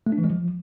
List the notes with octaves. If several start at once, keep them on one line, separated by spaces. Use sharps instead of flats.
A3
D4
E3
G#3
F3